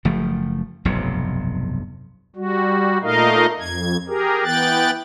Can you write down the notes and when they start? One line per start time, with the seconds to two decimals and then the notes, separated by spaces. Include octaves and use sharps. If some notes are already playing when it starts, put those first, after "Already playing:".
0.05 F#1 F3 A3
0.85 F1 B1 G2 C3
2.36 G3 F#4
3.02 A#2 A3 D#4 A#4 D#5 F5
3.60 F2 G#6
4.08 G4 G#4 A#4
4.44 E3 B3 G5 F#6 A6